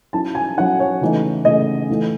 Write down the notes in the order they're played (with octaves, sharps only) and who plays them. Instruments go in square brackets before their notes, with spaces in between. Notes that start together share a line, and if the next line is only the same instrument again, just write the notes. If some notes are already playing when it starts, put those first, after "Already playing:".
[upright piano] F#3 C#4 E4 A5
G#5
F#3 C#4 E4 F#5
C#5
C#3 E3 A3 D#4
C#3 E3 A3 D#4 D#5
E3 A3 E4